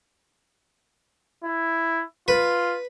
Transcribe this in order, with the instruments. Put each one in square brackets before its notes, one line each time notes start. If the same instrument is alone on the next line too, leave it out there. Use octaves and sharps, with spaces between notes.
[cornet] E4
[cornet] F4 [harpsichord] B4